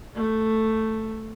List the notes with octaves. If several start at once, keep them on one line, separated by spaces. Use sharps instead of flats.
A3